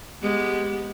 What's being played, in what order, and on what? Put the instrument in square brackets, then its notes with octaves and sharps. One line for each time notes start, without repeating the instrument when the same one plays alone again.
[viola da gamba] G#3 B3 G4